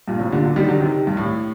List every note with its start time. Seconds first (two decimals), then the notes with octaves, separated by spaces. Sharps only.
0.08 G2 A#2
0.20 A2 C3
0.32 A#2 D3
0.44 D3 F#3
0.56 D#3 G3
0.68 D3 F#3
0.80 C3 D#3
1.07 G2
1.17 A2